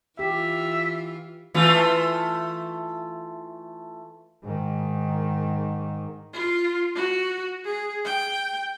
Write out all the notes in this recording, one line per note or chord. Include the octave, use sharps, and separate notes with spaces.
E3 F4 G4 E5
E3 A3 F4
G#2 D#3
F4
F#4
G#4
G5